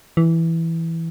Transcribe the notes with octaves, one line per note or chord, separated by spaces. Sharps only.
E3